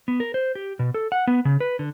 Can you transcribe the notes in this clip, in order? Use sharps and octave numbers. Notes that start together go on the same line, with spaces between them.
B3
A#4
C5
G4
B2
A4
F#5
B3
C#3
B4
D3